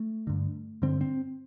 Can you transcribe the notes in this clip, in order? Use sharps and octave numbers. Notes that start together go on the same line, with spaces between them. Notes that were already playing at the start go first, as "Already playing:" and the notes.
Already playing: A3
G2 D3
G2 D3 C4
C4